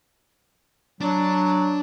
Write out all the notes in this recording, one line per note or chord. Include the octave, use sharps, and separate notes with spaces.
F#3 D4